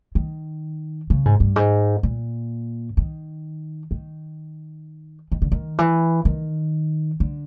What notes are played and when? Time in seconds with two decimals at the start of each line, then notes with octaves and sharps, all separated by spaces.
0.15 D#3
1.10 C#3
1.25 G#2
1.40 G2
1.56 G#2
2.03 A#2
2.97 D#3
3.91 D#3
5.32 D#3
5.42 D3
5.52 D#3
5.79 E3
6.25 D#3
7.20 D3